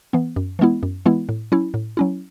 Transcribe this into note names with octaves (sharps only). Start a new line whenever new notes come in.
E3 B3
F#2
E3 G#3 B3 E4
F#2
E3 G#3 B3 E4
A2
F#3 C#4 E4
A2
F#3 C#4 E4